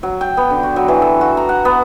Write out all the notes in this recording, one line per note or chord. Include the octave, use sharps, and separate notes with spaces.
F#3
G5
B3
D3
F#4
F#3
E3
A4
F#4
A#5
F#5
B3